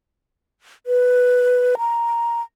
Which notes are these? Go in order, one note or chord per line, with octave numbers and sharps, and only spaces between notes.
B4
A#5